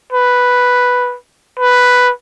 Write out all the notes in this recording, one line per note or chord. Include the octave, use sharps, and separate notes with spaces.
B4
B4